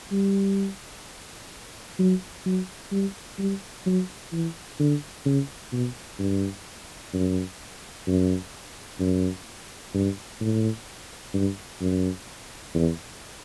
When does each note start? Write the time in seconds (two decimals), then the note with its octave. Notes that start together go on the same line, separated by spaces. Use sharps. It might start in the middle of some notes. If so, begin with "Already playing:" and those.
0.12 G3
1.99 F#3
2.45 F#3
2.91 G3
3.39 G3
3.86 F#3
4.32 E3
4.79 D3
5.25 C#3
5.72 B2
6.19 G2
7.13 F#2
8.07 F#2
9.00 F#2
9.94 G2
10.41 A2
11.34 G2
11.81 F#2
12.74 E2